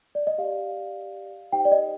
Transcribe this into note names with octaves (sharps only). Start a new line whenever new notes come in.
D5
D#5
G4 D5 F5
D#4 G4 C5 G5
D5
D#5